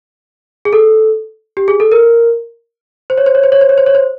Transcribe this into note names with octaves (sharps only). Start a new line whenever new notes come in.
G#4
A4
G4
G#4
A4
A#4
C5
C#5
C5
C#5
C5
C#5
C5
C#5
C5
C#5
C5